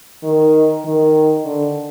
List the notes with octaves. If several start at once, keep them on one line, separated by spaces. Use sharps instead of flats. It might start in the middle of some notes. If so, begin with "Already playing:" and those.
D#3
D#3
D3